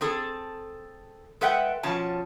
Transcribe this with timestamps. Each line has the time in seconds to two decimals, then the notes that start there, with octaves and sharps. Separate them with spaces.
0.01 C4 G#4 A4
1.41 G#3 A4 B4 E5 F#5 G5
1.83 B2 F3 C#4 A5